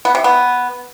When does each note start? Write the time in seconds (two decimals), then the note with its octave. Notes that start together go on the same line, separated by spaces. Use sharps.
0.05 B3
0.15 C3
0.24 B3